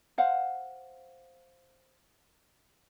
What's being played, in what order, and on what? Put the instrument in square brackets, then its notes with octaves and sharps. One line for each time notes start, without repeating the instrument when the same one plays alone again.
[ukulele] C5 F5 F#5